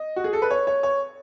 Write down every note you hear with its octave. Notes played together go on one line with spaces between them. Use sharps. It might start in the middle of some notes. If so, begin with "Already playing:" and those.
Already playing: D#5
F#4
G#4
A4
B4
C#5
C#5
C#5